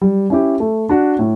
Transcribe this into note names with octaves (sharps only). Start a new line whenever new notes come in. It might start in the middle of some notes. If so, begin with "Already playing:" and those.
G3
C#4 E4 G4
A3
D4 F#4
A2